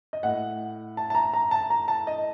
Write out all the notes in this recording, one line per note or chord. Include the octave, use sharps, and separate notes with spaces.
D#5
A2 F#5
A5
A5
A#5
A#5
A5
A#5
A5
D#5